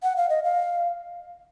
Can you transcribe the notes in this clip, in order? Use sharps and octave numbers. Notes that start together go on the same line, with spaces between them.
F#5
F5
D#5
F5